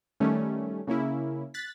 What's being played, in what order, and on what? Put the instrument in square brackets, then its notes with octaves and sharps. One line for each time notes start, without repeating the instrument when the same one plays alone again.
[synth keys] D#3 G3 A3 C#4
C#3 A#3 C#4 E4
F#6 A6 B6